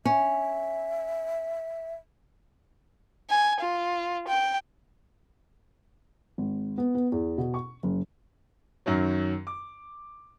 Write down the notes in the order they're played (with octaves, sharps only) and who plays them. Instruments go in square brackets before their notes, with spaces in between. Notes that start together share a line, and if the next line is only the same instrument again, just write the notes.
[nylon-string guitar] C#4 [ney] E5
[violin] G#5
F4
G5
[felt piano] G#1
B3
B3
E2
B2
C#6
F#1
[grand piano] F#2 D#3 F#3
D6